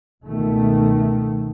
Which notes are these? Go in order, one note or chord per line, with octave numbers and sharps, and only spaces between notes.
C#2 B2 D#3 A3